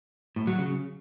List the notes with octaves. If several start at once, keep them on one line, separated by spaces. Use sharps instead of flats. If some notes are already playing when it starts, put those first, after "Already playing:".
A2
F#3
C#3